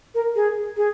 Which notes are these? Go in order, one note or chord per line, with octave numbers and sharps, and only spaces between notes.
A#4
G#4
G#4